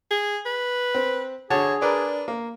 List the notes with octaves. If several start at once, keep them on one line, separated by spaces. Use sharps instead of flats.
G#4
B4
C4
D3 F#4 G#4 C#5 A5
D4 A#4 B4 D5
A#3